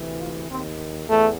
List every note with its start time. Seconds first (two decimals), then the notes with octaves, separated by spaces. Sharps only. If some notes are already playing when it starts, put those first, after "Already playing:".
Already playing: D2 C3 E3
0.19 F4
0.50 D#2 D#3 C4
1.08 E2 A3